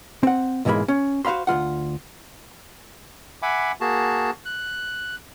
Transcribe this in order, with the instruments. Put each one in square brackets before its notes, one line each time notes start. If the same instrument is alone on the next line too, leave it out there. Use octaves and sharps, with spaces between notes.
[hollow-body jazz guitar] C4 F#5
B1 G#2 E3 G#3 A#3 B5
C#4
F#4 C5 F5 B5 C6
D2 E3 F4 F#5
[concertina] E5 F#5 G#5 B5 D6
A#3 F#4 G#4 A5
F#6